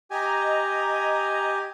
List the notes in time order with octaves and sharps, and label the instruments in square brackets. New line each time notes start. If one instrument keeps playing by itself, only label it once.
[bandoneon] G4 G#5 [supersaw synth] D#5 A#5